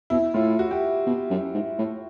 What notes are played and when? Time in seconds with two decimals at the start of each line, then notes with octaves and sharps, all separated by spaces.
0.10 B2 E4
0.34 A2 F4
0.59 F#4
0.71 G4
1.07 B2
1.30 F#2
1.54 G#2
1.78 A2